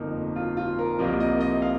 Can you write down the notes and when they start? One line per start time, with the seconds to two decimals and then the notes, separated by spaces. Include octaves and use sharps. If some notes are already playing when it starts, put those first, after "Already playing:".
Already playing: G1 F2 F3 A#3 D#4
0.36 F4
0.57 F4
0.79 A#4
0.99 C2 C3 F3 A#3 D#5
1.20 D#5
1.40 D#5
1.62 F5